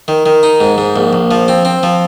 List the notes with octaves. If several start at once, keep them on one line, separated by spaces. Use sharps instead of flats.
D#3
D#3
D#4
G#2
G#2
A#1
A#1
F3
C4
C4
F3